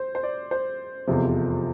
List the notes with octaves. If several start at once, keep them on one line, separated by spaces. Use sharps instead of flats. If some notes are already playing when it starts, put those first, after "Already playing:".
Already playing: C5
C5
D5
C5
F1 E2 C3 F3